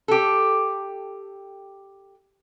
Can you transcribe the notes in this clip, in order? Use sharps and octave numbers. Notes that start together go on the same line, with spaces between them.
G4 A4